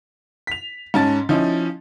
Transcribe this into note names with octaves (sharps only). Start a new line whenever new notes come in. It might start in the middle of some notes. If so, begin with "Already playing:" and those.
B6 F7
G#2 C#4 A5 A6
F3 C#4 D#4 E4